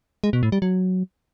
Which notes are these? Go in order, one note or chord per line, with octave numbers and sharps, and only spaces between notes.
G#3
B2
A2
G3
F#3